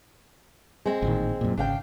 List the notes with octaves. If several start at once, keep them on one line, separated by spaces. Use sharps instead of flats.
G#3 C4
A1 A#2 D#3
F#2 A#2
G#1 C#3 D4 F5 G5